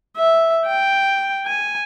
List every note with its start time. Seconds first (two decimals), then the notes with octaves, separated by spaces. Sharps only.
0.17 E5
0.67 G5
1.47 G#5